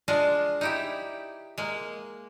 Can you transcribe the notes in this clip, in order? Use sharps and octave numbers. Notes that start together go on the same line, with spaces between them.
G#3 D4 F4 D#5
D#4 E4 G4
G#3 A#3